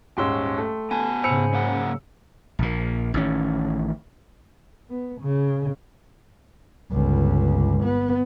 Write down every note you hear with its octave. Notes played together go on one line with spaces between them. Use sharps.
D#1 G#2 C#4 G5 C6 E6
A3
B3 G#5 A5
G#2 C#3 C5 G#5 B5 E6 C#7 F7
F#2 A#3 F#5
A#1 A#2
A1 D#3 C#4
B3
C#3
G1 C#2
B3